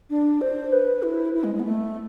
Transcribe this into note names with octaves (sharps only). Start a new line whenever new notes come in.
D4
C5
B4
E4
E4
G#3
G#3
B3
A3